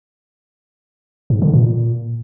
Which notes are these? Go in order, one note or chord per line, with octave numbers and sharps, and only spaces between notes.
G#2
D3
A#2